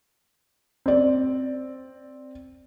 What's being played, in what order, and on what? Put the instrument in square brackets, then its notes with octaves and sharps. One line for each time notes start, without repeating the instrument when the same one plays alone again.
[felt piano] C4 D5